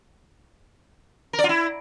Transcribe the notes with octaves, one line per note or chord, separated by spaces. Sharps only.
A#4
D5
F4
E4